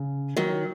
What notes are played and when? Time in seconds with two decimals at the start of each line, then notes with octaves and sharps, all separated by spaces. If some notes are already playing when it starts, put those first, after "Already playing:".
Already playing: C#3
0.37 D#3 F#3